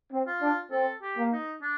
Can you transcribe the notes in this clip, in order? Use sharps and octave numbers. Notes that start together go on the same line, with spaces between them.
C4
F4
D4
C4 A4
G4
A#3
D#4
D4